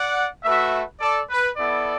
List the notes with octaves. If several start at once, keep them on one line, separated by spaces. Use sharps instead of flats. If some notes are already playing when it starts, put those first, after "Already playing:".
Already playing: D5 F#5
A3 F#4 B4 E5
A4 D5
B4
B3 E4 A4 D5